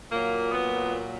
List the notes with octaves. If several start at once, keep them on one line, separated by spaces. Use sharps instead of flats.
A#2 F#3 A#3
B3